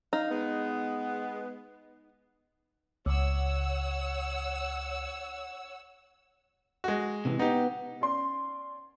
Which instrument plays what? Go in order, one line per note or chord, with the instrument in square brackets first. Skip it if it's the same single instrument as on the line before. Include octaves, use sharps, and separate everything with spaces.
[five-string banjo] D#4 [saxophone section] F5
[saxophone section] G#3 B3
[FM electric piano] C#2 [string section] C#5 F#5 E6
[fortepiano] G#3 F#4
[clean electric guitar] C3 D#3 E3
[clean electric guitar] B3 [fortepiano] D#4 G4
[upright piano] C#4 D5 C6